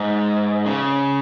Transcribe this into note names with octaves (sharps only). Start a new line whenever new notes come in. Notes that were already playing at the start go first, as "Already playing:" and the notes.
Already playing: G#2
C#3